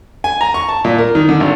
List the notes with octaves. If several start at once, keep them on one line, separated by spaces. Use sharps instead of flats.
G#5
A#5
C#6
A5
A#2
A#4
D#3
D3
G#1